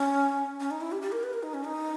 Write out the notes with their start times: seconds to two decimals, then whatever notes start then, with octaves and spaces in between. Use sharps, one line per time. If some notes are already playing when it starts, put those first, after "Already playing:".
Already playing: C#4
0.60 C#4
0.71 D#4
0.81 E4
0.92 G4
1.02 G4
1.12 A#4
1.23 B4
1.33 A#4
1.43 D#4
1.54 C#4
1.64 D#4